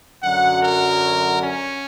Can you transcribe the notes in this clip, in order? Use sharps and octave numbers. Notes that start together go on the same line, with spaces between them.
F#2 D3 F#3 F#5
A#4
C#4